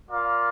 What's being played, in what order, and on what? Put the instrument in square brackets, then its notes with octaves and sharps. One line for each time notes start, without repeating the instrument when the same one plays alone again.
[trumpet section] F4 A#4 D5 F5